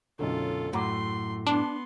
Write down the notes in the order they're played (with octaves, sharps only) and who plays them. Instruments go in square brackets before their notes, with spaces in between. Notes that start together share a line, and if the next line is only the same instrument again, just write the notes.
[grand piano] B1 F#2 D3 [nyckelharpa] F4 A4
[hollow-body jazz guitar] F#2 A2 [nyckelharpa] A3 C6 [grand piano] F#5 A#5 D6
[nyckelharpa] B3 C6 [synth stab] D4